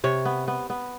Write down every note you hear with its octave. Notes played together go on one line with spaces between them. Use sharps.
C3 C#5
B3
B3
B3